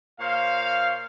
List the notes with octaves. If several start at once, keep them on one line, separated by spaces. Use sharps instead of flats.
A#2 C5 C#5 F5